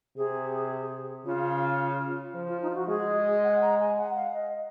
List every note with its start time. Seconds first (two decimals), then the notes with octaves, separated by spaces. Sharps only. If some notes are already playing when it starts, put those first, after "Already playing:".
0.17 C3 G#4
1.26 C#3 F4
2.34 F3
2.48 F4
2.62 D#4
2.70 F4
2.75 F#4
2.89 G#3 G#4
3.44 F#5
3.62 A#5
3.80 G#5
3.98 F#5
4.16 F5
4.34 D#5